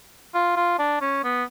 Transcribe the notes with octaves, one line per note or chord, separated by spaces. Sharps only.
F4
F4
D4
C#4
B3